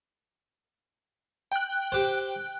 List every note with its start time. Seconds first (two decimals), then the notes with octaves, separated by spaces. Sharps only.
1.52 G5 F#6
1.92 G4 C5